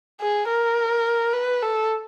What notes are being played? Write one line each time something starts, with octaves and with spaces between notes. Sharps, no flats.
G#4
A#4
B4
A4